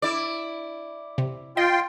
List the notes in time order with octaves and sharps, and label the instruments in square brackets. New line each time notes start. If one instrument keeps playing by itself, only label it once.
[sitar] E4 D5
[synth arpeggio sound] C3
[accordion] F4 G5 C6 [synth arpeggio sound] D#5